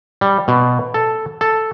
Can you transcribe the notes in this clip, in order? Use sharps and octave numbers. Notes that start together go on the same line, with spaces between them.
G3
B2
A4
A4